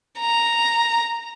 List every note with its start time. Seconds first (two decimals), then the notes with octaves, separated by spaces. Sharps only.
0.19 A#5